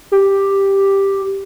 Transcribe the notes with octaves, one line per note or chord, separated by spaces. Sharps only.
G4